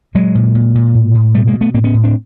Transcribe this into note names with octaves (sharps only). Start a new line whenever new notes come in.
A#2 F#3 G#3
A#2
A#2
A#2
A2
A2
B2 G3 A3
G#3 A#3
B2
A3 B3
A2 A#3 C4
B3 C#4
A2
C4 D4